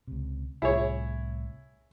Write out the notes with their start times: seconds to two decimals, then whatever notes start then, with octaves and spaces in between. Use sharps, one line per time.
0.07 C#2 C3
0.62 C2 A2 E4 G#4 C#5